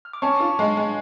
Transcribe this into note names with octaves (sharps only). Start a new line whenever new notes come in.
F6
D6
C#4 A5 C#6
F4
G#3
G#3